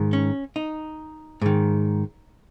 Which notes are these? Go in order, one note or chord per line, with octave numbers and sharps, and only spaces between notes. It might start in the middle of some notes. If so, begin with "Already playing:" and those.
Already playing: G#2 D#3
C#4
D#4
G#2 D#3